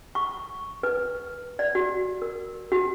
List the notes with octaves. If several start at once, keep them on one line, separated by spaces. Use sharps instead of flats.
C#6
B4
D5
F#4
A#4
F#4